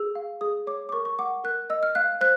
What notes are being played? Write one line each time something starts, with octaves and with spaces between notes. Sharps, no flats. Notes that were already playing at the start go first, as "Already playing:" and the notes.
Already playing: G#4 E6
F5
G#4 D#6
C#5 D6
D6
A#4 C#6
C#6
F#5 D6
A#4 F#6
D#5 E6
F6
F5 F#6
C5 F#6